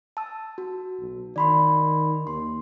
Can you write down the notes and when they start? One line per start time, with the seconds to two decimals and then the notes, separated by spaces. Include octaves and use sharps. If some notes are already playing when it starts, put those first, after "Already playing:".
0.17 A5 E6
0.58 F#4
1.00 B1
1.36 D#3 D5 B5 C6
2.27 D#2 C6